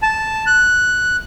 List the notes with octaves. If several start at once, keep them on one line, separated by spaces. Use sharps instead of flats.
A5
F#6